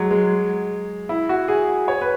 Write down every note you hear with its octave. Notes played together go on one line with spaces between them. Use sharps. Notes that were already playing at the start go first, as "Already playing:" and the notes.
Already playing: F#3 G#3
G#3
E4
F#4
G#4
C#5
B4